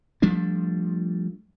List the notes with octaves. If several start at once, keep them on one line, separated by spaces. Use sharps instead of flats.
F3 G3 A3 D4